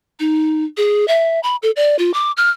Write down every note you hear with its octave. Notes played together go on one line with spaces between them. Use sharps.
D#4
G#4
E5
B5
A4
D5
F4
D6
F6